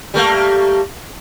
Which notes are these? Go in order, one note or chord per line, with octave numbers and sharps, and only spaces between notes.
G3 A3 A#3